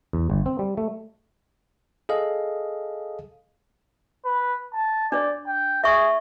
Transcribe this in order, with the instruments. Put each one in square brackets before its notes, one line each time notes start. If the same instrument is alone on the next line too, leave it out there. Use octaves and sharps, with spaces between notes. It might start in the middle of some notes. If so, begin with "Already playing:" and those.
[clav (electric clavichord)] E2
G1
C4
G3
A3
[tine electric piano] G#4 A4 D#5 F5
[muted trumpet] B4
A5
[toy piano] D4 C#5 [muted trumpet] D5
[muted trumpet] G5
[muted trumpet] G#4 [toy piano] E5 C#6